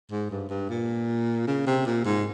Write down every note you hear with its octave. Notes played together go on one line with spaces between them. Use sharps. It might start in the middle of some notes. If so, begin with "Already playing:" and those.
G#2
G2
G2
A#2
C#3
C3
A#2
G#2